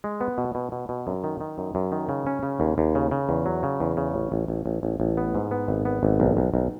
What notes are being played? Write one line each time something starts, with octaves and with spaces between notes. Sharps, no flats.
G#3
B3
B2
B2
B2
B2
F#2
D#3
D#3
F#2
F#2
D#3
C#3
C#4
C#3
D#2
D#2
C#3
C#3
E2
F#3
C#3
E2
C#3
A1
A1
A1
A1
A1
A1
B3
G#2
B3
G#1
B3
G#1
B1
B1
B1